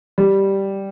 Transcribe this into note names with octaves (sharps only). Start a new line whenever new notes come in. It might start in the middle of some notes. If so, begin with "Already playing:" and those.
G3